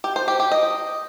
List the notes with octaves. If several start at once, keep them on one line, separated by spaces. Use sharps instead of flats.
G4
C5
G4
G4
D#5